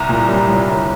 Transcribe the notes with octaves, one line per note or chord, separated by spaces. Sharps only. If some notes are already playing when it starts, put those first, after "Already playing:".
Already playing: C2 A#5
A#2
G3
C2
G1